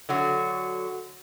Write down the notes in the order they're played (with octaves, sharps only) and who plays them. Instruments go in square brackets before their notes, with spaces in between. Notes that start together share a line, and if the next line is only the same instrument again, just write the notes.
[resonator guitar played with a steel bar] D3 F#3 F#4